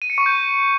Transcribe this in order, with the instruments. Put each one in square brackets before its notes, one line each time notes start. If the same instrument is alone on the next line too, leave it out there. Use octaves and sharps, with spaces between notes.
[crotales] D#7
C#7
C#6
G6